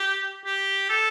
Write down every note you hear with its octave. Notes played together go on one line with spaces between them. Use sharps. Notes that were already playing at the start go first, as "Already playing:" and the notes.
Already playing: G4
G4
A4